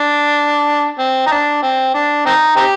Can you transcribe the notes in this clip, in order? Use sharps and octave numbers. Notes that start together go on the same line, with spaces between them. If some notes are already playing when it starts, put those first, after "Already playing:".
Already playing: D4
C4
D#4
D4
C4
D4
C4 D#4
C4 D#4 G4